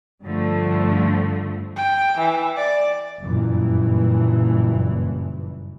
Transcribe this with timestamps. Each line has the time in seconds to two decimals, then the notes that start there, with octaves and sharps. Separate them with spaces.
0.24 G2 D3 F3 A3
1.76 G5
2.18 E3
2.57 D5
3.22 F#1 G2 A#2 E3